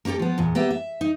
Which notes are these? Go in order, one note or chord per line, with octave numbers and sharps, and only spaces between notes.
A#3 C#4 D#4 G4 A4
F3 B3
E2 A#2
A#3 B3 G4 E5
E5
D#4